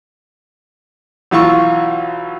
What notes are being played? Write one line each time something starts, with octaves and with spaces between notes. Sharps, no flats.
B1 E3 F4 C#6 E6